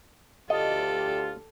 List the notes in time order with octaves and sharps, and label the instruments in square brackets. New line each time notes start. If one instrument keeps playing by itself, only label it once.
[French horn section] D2 G4 [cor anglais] F4 [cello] A4 D5 [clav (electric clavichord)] D#5